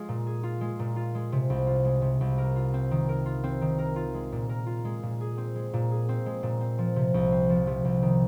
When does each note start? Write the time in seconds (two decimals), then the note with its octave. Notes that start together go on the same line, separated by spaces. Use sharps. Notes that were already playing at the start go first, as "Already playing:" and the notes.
Already playing: G#3 F4 G#4
0.09 A#2
0.27 G#4
0.43 F4
0.61 G#3
0.79 A#2
0.96 F4
1.15 G#3
1.32 C3
1.50 C2
1.67 F4
1.85 G#3
2.02 C3
2.21 C2
2.38 A#4
2.56 F4
2.74 C4
2.91 D#3
3.09 A#4
3.26 F4
3.44 C4
3.61 D#3
3.78 A#4
3.96 F4
4.14 G#3
4.32 A#2
4.49 A#4
4.67 F4
4.85 G#3
5.03 A#2
5.21 G#4
5.38 C4
5.56 G#3
5.73 A#2
5.91 G#4
6.09 C4
6.26 G#3
6.43 A#2
6.61 C4
6.78 F3
6.96 C3
7.14 C2
7.32 C4
7.49 F3
7.67 C3
7.85 C2
8.02 D#3